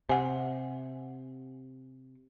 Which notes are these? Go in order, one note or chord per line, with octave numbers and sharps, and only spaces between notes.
C3 F#5 G#5